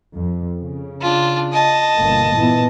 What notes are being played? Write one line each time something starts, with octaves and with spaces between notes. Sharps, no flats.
F2
C#3
D4 F4
D#5 A5
G1 B2 A#3
A#2 E3 B3